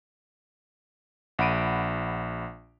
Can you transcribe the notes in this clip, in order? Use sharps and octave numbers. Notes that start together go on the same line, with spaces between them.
A#1 F#5 B5 D7 D#7